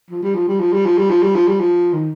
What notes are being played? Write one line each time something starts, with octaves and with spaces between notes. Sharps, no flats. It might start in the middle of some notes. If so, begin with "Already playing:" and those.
F3
G3
F3
G3
F3
G3
F3
G3
F3
G3
F3
G3
F3
D#3